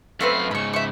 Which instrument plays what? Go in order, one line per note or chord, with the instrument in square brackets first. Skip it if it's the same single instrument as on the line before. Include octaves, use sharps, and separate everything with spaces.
[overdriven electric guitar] F#2 F5 [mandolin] A3 C4 B4
[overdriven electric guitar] G#2 C#3 [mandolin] B5 C#6
[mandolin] E5 C#6